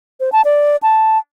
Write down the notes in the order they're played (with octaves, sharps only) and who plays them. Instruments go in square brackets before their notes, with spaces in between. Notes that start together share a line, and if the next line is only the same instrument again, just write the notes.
[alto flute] C5
A5
D5
A5